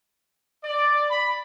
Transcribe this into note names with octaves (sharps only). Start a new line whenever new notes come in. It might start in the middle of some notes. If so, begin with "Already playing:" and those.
D5
B5